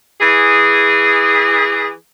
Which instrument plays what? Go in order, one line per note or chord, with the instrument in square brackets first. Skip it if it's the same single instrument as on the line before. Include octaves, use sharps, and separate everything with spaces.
[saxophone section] E3 G#4